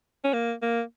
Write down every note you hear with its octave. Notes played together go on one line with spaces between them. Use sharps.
C#4
A#3
A#3